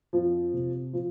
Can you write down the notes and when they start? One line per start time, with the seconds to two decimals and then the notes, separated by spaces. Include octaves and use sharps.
0.13 F2 F3
0.53 C3
0.93 F3